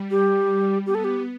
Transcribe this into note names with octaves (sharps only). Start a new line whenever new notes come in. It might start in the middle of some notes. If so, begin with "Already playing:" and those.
Already playing: G3
G4
B3 G4
A4
G4